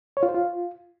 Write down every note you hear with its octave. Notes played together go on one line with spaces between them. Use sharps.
C#5
F4
C5
F4